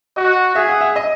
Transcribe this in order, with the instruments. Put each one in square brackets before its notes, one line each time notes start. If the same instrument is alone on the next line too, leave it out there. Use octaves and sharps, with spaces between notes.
[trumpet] F#4 [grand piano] D#5
[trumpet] G#4 [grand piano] E5
[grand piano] F#5
E5
D#5